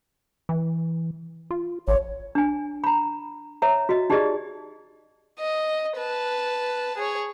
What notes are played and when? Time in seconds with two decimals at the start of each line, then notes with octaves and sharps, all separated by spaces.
0.49 E3
1.51 F4
1.88 A1 C#5
2.35 D4 G#5
2.84 A#5 B5
3.62 C#5 E5 A#5
3.89 F#4 D#5
4.10 D#4 G4 G#4 D5 D#5
5.39 D#5
5.97 B4 A5
6.97 G#4 C#5